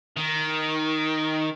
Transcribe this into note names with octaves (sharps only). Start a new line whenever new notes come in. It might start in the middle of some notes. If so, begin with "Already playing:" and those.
D#3